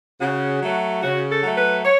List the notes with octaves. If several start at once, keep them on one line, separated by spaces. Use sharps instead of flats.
C#3 F#4
F#3 A3
C#3 F#4
A4
F#3 A3
B4
C#5